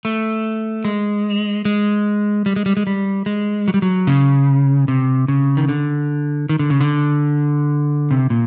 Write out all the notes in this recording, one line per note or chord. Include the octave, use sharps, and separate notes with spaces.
A3
G#3
G#3
G3
G#3
G3
G#3
G3
G#3
F#3
G3
F#3
C#3
C3
C#3
D#3
D3
D#3
D3
C#3
D3
C3
A#2